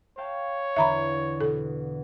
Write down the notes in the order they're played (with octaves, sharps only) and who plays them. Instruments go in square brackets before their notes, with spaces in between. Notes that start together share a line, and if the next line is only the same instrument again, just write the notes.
[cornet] C#5 [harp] F5 G5 A5
[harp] E2 D3 [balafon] E5 A#5 B5
[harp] B2 [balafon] A4